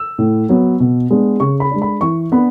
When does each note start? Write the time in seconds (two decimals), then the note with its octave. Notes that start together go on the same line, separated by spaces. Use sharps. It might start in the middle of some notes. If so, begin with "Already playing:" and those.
Already playing: E6
0.19 A2
0.49 F#3 B3
0.80 B2
1.11 G#3 B3 D4
1.40 C#3 C#6
1.60 B5
1.71 G#3 D4
1.82 B5
2.01 E3 C#6
2.32 B3 D4 B5